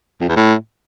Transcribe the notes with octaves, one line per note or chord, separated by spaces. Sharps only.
F2
E2
A2